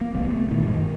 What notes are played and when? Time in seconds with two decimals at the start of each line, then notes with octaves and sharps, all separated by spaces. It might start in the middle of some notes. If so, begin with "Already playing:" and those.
0.01 A#3
0.14 D1 C2 G3 B3
0.31 A3
0.51 A#2 D#3 E3
0.64 G2 G#3
0.76 D#3